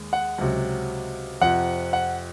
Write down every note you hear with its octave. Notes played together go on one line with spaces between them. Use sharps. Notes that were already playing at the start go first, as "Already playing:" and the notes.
Already playing: D#2 G#3
F#5
C#2 C3 F#3
F2 C3 F3 F#5
F#5